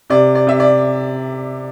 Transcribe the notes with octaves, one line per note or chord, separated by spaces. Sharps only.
C3 D5
D5
C3 E5
D5